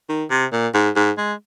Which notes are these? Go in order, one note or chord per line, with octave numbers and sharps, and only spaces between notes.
D#3
C3
A#2
G#2
G#2
G#3